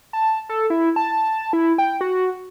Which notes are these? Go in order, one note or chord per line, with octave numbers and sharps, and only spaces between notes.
A5
A4
E4
A5
E4
G5
F#4